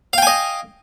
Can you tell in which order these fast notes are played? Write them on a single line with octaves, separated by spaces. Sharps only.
F5 G5 G#5 D#5